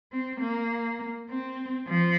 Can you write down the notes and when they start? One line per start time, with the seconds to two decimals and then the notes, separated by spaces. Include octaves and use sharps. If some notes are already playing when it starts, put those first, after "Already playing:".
0.12 C4
0.41 A#3
1.30 C4
1.88 F3